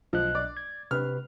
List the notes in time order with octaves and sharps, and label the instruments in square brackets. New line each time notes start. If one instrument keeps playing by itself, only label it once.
[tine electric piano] B1 D#5 F#6 [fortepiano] F3
[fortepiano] D5
[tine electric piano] G#6
[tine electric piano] C3 B4 [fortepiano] F6